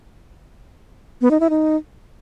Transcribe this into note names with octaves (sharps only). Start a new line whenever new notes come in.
B3
D#4
E4
D#4